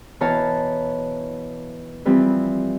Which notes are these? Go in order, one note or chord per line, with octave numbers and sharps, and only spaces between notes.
B2 E3 C#5 F5 A5 A#5
E3 F3 G3 C4